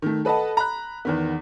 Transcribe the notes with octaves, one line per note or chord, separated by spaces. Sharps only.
D#3 A3
A4 B4 D#5 F#5 A5
A#5 B5 F#6
E2 D#3 B3